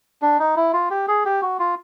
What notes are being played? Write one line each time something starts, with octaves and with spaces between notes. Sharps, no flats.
D4
D#4
E4
F4
G4
G#4
G4
F#4
F4